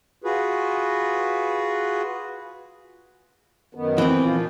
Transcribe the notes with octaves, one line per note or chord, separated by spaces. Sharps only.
F4 F#4 G#4 B4
F#2 D#3 B3
E3 C4
A#2 F3 F4